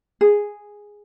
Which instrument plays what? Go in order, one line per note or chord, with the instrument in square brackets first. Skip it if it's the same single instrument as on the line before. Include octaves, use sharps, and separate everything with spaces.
[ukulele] G#4